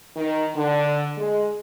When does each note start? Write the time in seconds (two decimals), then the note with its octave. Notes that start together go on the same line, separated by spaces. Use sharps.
0.16 D#3
0.56 D3
1.17 G#3